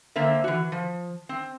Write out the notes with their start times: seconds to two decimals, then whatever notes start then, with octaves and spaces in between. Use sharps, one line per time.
0.16 D3 A#3 C4 E5
0.44 E3 F#4
0.72 F3
1.29 C4